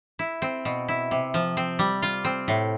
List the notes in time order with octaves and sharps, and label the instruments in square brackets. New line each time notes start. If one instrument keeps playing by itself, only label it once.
[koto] E4
C4
B2
E4
C3
F3
C4
G3
F4
C4
A2